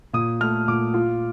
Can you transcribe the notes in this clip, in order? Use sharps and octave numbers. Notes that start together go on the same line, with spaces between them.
A#2 D#6
A3 F6
A#2 D6
F4